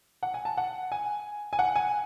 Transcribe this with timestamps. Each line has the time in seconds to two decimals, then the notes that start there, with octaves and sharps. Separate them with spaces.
0.23 F#5
0.34 G#5
0.45 A5
0.57 F#5
0.92 G#5
1.53 G#5
1.59 F#5
1.76 G#5